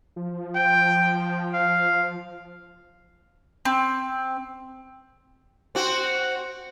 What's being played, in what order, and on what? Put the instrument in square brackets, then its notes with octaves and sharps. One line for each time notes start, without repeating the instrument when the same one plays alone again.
[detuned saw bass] F3
[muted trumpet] G5
F5
[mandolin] C4
[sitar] C4 F#4